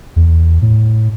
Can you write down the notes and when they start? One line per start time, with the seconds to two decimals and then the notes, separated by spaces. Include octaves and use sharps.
0.16 E2
0.62 A2